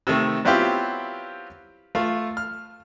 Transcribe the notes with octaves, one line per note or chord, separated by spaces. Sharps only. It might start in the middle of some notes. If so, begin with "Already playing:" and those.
C3 D#3 A3
F#3 B3 C4 E4 F4 G4
A3 F4 F5
F6